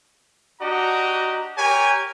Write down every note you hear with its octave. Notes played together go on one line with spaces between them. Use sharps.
D4 F#4 G4 D#5 A#5
G4 A#4 C#5 G5 G#5